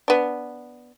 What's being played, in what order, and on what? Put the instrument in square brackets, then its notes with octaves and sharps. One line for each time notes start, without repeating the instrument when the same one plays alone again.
[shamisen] B3 D4